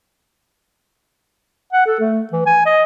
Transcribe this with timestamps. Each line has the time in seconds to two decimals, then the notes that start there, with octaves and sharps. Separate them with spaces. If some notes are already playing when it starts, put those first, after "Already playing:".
1.73 F#5
1.86 A4
2.00 A3
2.32 E3
2.46 G#5
2.66 D#5